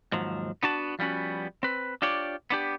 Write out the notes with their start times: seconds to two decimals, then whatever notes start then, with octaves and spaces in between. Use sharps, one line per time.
0.12 D#2 G#2 F3 F#3
0.63 B3 D4 F#4 A5
0.99 F3 G3 B3 C#4 F#4
1.63 C4 B4
2.02 D4 F4 G4 C#5 D5
2.50 B3 D4 G4